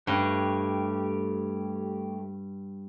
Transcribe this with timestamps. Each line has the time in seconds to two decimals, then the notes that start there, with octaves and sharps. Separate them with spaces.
0.07 G2 A3 G4 C#5